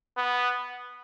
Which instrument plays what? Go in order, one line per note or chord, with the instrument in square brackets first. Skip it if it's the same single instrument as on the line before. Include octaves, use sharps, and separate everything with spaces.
[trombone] B3